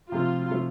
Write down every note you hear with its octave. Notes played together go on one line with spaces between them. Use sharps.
C3 F3 A3 F4
C3 F3 A3